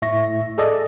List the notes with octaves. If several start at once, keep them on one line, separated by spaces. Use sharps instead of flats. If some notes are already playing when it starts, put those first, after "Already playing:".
A2 E5 C#6 A#6
G#4 A4 D5 D#5